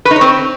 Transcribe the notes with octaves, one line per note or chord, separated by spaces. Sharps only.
B4
D#4
C#5
C4